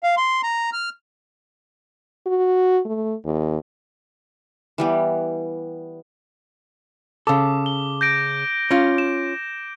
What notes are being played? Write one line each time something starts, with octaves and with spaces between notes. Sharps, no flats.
F5
C6
A#5
F6
F#4
A3
D#2
E3 G3 B3
C#3 A4 D6
G7
G6 A#6 D7
C#4 F4
E7